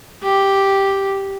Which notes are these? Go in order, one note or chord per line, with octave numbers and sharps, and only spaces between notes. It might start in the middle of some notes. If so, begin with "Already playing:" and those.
G4